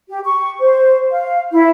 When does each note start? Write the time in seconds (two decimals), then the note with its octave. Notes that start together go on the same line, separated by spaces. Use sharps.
0.09 G4
0.25 C#6
0.60 C5
1.11 F5
1.52 E4